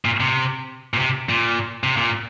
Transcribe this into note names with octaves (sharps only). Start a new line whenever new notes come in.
A#2
C3
A#2
C3
A#2
C3
A#2